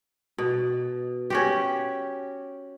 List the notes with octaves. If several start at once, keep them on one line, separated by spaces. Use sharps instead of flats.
B2
C#4 F#4 G4